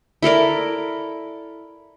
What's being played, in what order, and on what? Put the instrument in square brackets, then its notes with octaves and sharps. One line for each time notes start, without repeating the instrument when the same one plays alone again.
[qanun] E4 A4 A#4 D5